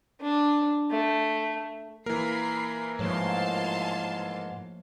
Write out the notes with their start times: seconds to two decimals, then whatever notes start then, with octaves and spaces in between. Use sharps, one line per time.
0.21 D4
0.90 A3
2.06 E3 A#3 A#4 A#5 B5 C7
2.99 G#2 F3 A3 C#5 F5 A5 C6